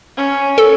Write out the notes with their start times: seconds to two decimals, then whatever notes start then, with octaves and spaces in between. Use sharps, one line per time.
0.17 C#4
0.58 A4